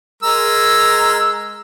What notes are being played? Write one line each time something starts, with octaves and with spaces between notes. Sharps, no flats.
G#3 A#4 E6